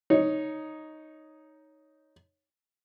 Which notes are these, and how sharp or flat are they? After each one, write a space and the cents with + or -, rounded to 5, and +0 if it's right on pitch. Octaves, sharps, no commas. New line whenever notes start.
D#4 +0 C#5 +0